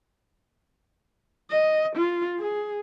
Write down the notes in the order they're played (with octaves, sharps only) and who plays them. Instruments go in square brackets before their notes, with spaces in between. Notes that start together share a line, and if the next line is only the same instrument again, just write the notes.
[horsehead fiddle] D#5
F4
G#4